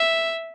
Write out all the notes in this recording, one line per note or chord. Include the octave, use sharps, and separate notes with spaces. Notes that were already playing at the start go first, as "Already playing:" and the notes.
Already playing: E5